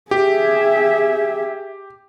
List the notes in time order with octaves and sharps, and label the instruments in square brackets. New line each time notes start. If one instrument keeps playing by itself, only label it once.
[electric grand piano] G4 [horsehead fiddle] G#4 E5